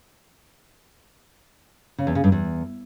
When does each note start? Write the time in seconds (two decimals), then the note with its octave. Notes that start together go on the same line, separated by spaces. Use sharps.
1.98 C#3
2.07 E2
2.15 C#3
2.24 G2
2.32 E2